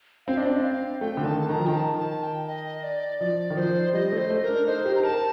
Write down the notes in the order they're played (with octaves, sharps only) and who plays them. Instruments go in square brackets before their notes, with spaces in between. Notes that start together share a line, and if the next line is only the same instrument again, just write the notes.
[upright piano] C4 [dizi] F5
[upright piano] D4 [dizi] D#5
[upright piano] C4 [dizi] D5
[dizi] D#5
F5
[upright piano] A3 [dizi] G5
[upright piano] D3
[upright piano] D#3 [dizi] A5
[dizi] A5
[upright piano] D#3 [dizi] A#5
[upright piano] F3
[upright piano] D#3 [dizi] G5
[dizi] A5
A5
G5
D#5
D5
[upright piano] F3 [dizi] D5
[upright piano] D#3
[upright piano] F3 [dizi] C5
[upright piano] G3 [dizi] D#5
[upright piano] A3
[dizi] C5
[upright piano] A3
[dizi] A#4
[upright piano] D4
[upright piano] D#4 [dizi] C5
[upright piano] G4
[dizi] A#5
[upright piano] A#4 [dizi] A5